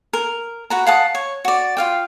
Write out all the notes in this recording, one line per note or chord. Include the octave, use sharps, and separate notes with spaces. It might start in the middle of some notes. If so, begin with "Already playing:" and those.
A#4
F#4 B4 A#5
F5 F#5 A5 D#6
C#5
F#4 D5
F4 F5 G5